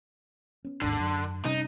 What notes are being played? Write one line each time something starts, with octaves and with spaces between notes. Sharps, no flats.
B3 C#4
G#1 D#2 G#2 D3
F#2
C3 G3 C#4 D#4